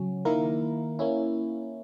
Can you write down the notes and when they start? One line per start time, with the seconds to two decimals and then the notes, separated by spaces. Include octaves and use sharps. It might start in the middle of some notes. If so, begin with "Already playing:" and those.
Already playing: C#3 F#3 C#4
0.25 D#3 A#3 E4 A#4
0.99 A#3 C#4 E4